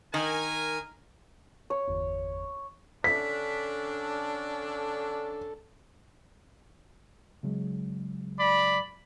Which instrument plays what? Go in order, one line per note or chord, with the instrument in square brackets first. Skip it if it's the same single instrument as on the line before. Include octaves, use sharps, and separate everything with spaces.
[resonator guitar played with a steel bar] D#3 [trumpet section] A#4 G#5
[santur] C#5
[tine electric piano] G1 E2
[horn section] D3 C#4 D4 [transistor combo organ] A4 [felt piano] B6
[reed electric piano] C#3 F#3 G#3
[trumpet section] D5 B5